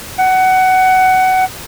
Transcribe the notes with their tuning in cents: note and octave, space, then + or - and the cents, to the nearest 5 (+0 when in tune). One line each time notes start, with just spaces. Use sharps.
F#5 +15